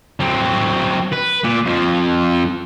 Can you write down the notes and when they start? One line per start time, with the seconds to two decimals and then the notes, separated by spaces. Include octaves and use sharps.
0.20 F#3 C4
1.12 B4
1.44 A#2
1.65 F2 F3